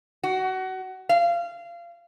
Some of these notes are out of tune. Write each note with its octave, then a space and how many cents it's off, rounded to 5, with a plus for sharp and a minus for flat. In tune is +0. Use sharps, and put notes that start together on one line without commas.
F#4 +25
F5 -25